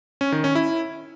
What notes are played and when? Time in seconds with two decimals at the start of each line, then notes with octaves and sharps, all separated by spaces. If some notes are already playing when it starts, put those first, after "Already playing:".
0.21 C#4
0.32 D#3
0.44 C#4
0.55 E4